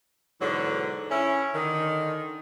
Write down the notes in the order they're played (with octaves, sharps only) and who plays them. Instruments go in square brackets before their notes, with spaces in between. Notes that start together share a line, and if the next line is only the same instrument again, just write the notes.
[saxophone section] G#2 B2 D3 E3 F#3
C#4 E4
D3 D#3